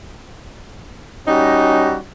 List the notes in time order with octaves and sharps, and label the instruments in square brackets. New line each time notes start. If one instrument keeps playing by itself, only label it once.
[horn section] G3 C#4 D#4 F#4